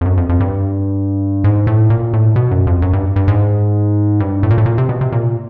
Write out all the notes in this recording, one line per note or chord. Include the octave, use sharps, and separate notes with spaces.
F2
F#2
F2
F2
G2
G#2
A2
A#2
A2
B2
F#2
F2
F#2
G2
G2
G#2
G2
A2
A#2
A2
A#2
C3
B2
C3
A#2